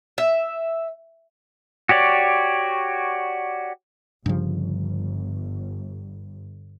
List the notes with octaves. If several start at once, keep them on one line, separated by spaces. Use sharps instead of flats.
E5
F#4 G4 C#5 D5
G1 G2 C#3 F3